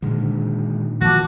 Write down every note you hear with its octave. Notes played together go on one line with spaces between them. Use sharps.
A#2 D3 D#3 G#3
D#3 F3 F#3 A#3 F#4 A5 D6